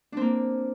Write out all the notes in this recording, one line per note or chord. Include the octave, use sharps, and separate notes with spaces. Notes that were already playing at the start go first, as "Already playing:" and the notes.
A#3 C4 D4